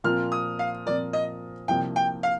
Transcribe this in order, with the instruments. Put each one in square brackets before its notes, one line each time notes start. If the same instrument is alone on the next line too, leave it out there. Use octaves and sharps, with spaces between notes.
[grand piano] A#2 F3 C4 F4 A#4 [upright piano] F6
[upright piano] D#6
F5
[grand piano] A#2 F3 C4 F4 A#4 [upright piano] D5
[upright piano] D#5
[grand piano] C2 C3 F3 A#3 [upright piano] G5
[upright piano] G5
F5